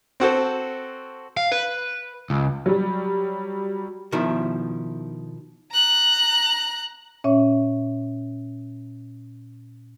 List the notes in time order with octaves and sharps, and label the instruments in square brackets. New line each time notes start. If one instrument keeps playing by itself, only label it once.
[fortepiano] C4 F#4 A4 C5
[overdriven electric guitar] F5
B4
C#2
[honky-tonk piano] F#3 G3
[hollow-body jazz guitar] B2 D#3 F3 E4
[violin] A#5 F#6
[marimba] A#2 C#4 C#5 E5